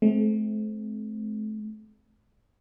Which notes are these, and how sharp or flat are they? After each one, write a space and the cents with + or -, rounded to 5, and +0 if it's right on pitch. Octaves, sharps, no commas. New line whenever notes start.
A3 -40 C4 +0